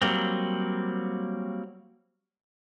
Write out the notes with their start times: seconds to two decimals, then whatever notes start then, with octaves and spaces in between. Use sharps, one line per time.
0.02 F#3 G3 A#3 C4